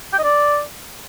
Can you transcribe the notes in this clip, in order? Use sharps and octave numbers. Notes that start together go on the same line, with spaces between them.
G5
D#5
D5